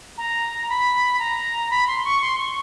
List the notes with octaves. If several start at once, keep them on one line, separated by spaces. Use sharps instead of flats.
A#5
B5
A#5
B5
C6
C#6
C6
C#6